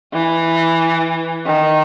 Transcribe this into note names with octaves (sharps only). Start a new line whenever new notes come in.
E3
D#3